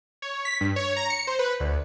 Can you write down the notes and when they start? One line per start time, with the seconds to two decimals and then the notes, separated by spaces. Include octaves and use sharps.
0.22 C#5
0.45 B6
0.61 G2
0.76 C#5
0.96 A#5
1.10 C#7
1.27 C5
1.39 B4
1.60 D2